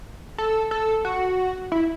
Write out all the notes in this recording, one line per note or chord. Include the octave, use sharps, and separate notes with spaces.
A4
A4
F#4
E4